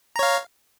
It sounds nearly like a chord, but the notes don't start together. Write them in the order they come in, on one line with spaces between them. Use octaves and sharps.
A#5 C#5 F5